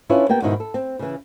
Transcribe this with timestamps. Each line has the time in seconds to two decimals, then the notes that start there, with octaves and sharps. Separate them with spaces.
0.09 C#4 D4 E4 F4 B4 C#5
0.29 A#3 B3 G4 G5
0.42 G#2 B2 D#3 D#4 E4
0.60 A4
0.74 C4
0.99 C#3 E3